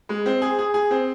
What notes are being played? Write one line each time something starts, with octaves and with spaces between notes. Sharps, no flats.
G#3
C4
G#4
G#4
G#4
C4